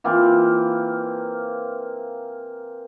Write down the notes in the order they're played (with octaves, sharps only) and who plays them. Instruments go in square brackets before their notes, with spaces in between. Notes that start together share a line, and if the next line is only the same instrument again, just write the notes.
[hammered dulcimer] E3 A#3 C4 F4